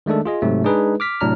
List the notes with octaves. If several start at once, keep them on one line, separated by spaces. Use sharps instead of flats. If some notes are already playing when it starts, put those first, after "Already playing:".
D#3 G#3 A3 D4 A4
F4 G#4 D#5
G#2 C3 F#3 A3
G#3 D4 D#4 G#4 B4
D6 F6 B6
A2 C3 F#3 D4 A#5 F6